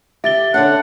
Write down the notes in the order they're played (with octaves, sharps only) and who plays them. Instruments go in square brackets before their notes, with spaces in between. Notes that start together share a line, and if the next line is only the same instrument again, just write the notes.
[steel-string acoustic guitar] G4 [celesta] E5 A6 G7
[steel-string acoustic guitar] D3 C#4 D4 [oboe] F#5